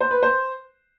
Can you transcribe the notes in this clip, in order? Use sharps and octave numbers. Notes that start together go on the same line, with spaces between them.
C5
B4
C5